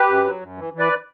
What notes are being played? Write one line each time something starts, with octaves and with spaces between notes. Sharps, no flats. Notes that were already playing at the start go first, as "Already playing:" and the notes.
Already playing: G4 B4
F#2
F#3
F#2
E3
E3
B4 D5